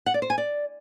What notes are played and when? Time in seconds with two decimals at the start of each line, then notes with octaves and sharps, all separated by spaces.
0.06 F#5
0.14 D5
0.22 C5
0.30 G#5
0.38 D5